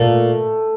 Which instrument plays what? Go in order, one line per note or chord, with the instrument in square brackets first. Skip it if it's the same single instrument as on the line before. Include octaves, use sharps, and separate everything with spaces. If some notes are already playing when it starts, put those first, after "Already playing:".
Already playing: [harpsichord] A#2 [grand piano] A3